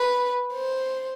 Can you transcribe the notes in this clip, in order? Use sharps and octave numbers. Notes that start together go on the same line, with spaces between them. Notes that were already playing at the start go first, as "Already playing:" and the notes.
Already playing: B4
C5